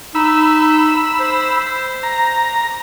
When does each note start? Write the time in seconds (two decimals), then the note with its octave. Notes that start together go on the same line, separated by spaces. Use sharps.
0.15 D#4 B5 E6
1.20 C5
2.03 A#5